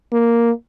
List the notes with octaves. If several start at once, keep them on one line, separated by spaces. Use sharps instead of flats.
A#3